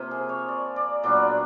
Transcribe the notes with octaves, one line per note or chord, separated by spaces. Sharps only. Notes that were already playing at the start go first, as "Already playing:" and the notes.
Already playing: C3 F3 A#3
G#4
C#5
D5
D5
A#2 F#3 B3 D4 D5